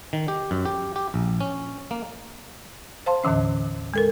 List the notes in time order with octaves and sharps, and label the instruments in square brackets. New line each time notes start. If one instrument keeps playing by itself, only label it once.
[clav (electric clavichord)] D#3
G4
F#2
G4
G4
A#1
C#4
A#3
[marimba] C5 F5 A5 C6
D#2 A2 D3 E3 C#4
G#3 A4 A#4